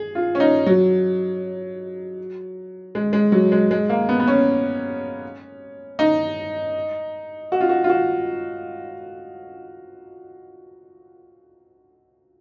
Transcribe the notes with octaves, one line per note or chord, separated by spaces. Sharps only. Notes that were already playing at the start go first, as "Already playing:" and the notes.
Already playing: G#4
F4
C#4
D#4
F#3
G#3
G#3
F#3
G#3
G#3
A#3
B3
B3
C#4
D#4
F#4
F4
F#4
F4
F#4